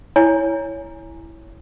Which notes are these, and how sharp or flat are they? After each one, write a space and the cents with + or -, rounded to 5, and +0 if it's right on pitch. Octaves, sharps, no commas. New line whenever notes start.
E4 +0 C#5 +10 G#5 +0